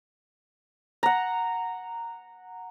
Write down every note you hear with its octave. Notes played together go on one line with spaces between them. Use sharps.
F#5 A#5